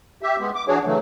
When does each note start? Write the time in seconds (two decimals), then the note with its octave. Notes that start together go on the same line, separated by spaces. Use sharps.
0.23 G4 E5
0.40 G#3 B3
0.55 D6
0.68 E3 D4 F#4 G#4 C#5
0.86 C#3 E3 F#3 A3